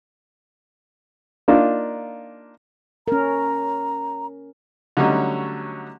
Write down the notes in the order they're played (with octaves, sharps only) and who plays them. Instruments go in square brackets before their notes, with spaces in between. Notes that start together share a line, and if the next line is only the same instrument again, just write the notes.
[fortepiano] A#3 D4 D#4 F4
[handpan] C#4 A#4 [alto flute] A#5
[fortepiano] D3 F#3 G3 A3 C#4 D#4